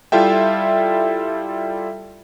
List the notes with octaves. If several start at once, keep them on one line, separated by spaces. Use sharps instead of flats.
G3 E4 F4 A4 E5 G5